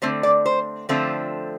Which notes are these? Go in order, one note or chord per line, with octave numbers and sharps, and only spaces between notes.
D3 A3 C4 C5
D5
C5
D3 F3 A3 C4 F4